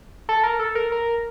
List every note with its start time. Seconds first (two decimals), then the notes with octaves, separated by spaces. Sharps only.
0.29 A4
0.43 A#4
0.59 A4
0.75 A#4
0.92 A#4